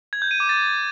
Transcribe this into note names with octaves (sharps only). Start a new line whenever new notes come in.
G#6
G6
D#7
D6
A6